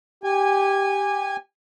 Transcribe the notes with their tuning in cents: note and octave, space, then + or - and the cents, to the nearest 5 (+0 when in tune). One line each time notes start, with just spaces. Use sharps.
G4 +0 G#5 -20